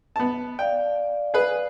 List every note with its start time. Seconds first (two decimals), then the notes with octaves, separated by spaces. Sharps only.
0.16 B3 A5
0.59 D5 F5 G5
1.34 G#4 B4